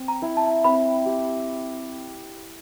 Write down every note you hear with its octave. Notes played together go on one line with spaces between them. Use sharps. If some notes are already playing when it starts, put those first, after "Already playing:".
Already playing: C4
A#5
E4
A5
C4 B5
G4